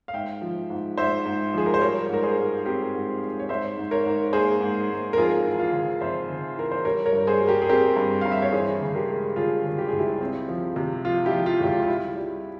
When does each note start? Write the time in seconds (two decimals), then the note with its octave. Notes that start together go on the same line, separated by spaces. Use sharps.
0.08 F5
0.13 G#2 E5 G5
0.42 F3
0.70 G#2
0.97 G#2 C5 E5
1.25 G#2
1.54 F3 G#4
1.66 A#4
1.74 C5
1.81 G3 A#4 C#5
2.10 G#2 A#4
2.23 G#4 C5
2.37 G#2
2.65 C4 G4 A#4
2.94 G#2
3.22 G#2
3.39 C#5
3.49 G#2 C5 E5
3.77 G#2
3.91 A#4 C#5
4.05 G#2
4.33 A#3 G#4 C5
4.61 G#2
4.90 G#2
5.13 A#4
5.17 F2 F4 G#4
5.46 E3
5.59 F4
5.73 C#3
6.01 F2 C5 E5
6.29 C#3
6.57 E3 A#4
6.71 C5
6.85 G3 A#4 C#5
7.05 A#4 C#5
7.13 G2
7.27 G#4 C5
7.41 G3
7.47 G4 A#4
7.62 G#4
7.69 C4 G4 A#4
7.96 G2
8.21 G2 F5
8.32 E5
8.42 C#5
8.52 E3 G#4 C5
8.81 C#3
8.95 G4 A#4
9.09 G#3
9.36 C#3 F4 G#4
9.64 C#3
9.78 G4
9.88 C#2 G#4
9.98 E4 G4
10.21 C4
10.49 F3
10.76 C3
11.05 F3 F4
11.25 E4 G4
11.32 F3
11.46 F4
11.60 C#2 G4
11.67 F4
11.83 F4
11.88 G3 E4
12.16 G3